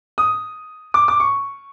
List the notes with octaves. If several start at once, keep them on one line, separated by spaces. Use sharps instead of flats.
D#6
D6
D6
C#6